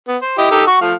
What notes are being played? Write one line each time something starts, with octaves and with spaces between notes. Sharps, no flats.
B3
C5
E4 G4 D#5
D#4 G4 A4
F#4 C#6
F3 A3 F5